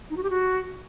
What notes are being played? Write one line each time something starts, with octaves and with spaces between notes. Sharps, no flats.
D#4
F#4
G4
F#4